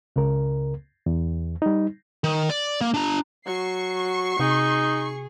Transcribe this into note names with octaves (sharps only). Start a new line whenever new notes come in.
C#2 C#3 A#4
E2
G3 D#4
D#3
D5
A#3
D4 A#5
F#3 C#6 C7
C3 D#4 G#4